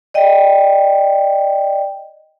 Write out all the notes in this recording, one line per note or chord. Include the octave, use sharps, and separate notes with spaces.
D5 D#5 G5